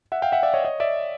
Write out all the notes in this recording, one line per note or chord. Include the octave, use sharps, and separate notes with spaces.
E5 F#5
F5 G5
E5 F#5
D5 E5
C#5 D#5
C#5 D#5
D5 E5